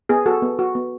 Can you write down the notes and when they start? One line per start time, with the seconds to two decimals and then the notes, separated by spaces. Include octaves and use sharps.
0.09 B3 G#4
0.26 F#4 A4
0.42 B3
0.59 F#4
0.75 B3